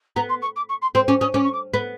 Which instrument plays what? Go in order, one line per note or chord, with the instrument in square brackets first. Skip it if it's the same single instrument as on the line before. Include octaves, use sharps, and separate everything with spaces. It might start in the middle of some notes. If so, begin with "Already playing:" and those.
[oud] B3 [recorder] A#5
[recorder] C6
C#6
D6
C#6
C6
[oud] C4 [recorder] C6
[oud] C#4 [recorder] D6
[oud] C#4 [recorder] D#6
[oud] C#4 [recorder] D6
[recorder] C#6
D6
[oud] B3 [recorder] B5